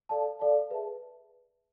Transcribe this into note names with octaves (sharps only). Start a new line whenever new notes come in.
A4 D5 F5 A5
A4 D5 F5 A5
G#4 B4 E5 A5